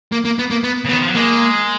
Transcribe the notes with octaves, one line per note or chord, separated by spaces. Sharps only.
A#3
A#3
B3
A#3
B3
C#3
B3
D#3
F3
F#3
G#3 A#3